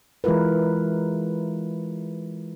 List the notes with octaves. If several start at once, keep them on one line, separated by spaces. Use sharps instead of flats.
E3 G#3 E4 F4 A#4 B4